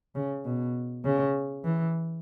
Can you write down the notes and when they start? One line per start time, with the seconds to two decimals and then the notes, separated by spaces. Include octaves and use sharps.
0.15 C#3
0.45 B2
1.04 C#3
1.64 E3